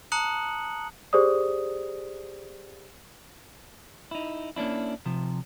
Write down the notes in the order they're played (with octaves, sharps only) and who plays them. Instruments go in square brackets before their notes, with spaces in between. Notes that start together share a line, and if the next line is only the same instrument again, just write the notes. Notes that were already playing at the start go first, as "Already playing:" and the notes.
[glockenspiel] A5 A#5 D#6 F#6 C#7 F#7
[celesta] G4 G#4 C5 D5 D#6
[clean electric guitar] D#4 E4
A#3 C#4 D4 E4
C3 F3